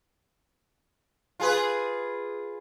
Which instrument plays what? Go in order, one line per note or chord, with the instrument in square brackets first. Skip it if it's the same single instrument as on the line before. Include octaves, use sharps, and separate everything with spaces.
[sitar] F4 G#4 B4